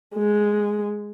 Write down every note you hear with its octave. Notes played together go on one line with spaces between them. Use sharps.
G#3